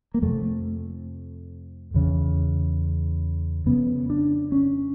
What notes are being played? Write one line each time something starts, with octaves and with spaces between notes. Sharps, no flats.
A#3
F2 C3 A3
E2 C#3
F2 C#3 B3
D4
C#4